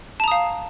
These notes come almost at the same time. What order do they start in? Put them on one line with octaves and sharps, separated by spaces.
A5 A#5 D#6 F5